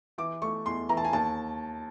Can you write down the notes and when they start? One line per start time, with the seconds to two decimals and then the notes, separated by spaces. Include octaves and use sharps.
0.18 E3 D6
0.42 A3 C#6
0.66 E2 C6
0.89 E3 A#5
0.97 A5
1.04 G#5
1.13 D#2 A5